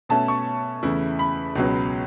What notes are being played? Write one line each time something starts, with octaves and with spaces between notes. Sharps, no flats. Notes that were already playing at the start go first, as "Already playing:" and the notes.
B2 A3 C#4 A5
C#6
E2 C#3 A3 E4
B5
C#2 B2 F#3 C#4